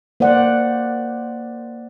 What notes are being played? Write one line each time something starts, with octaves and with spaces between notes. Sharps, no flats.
A#3 C5 D5 F#5